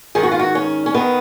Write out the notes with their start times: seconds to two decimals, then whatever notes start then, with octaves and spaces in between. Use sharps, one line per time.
0.15 G#2 D#3 G#4
0.23 F#4
0.32 F4
0.39 F#4
0.55 C#4
0.86 C#4
0.95 D#3 B3